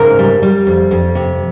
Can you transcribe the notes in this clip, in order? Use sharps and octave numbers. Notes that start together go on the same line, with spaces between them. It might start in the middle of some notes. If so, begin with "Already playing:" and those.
Already playing: G#2 C#3 A#4
G3
G3
F2
F2
C3